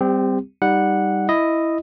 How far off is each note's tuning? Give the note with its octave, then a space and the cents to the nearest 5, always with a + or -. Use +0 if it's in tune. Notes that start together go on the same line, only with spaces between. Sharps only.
G3 +0 C4 -20 G4 +30
G3 +5 D#4 +0 F#5 -5
E4 +0 D#5 +0